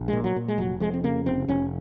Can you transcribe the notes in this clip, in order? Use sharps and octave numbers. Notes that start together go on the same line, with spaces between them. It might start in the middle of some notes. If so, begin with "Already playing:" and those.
Already playing: A#1
A#2 G#3
F#3
A#2
G#3
F1 F#3
F2 G#3
C4
C#3 A#3
F1 C4
F1 C#4